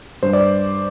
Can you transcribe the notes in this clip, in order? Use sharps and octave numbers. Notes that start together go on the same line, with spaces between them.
G2 C5
D5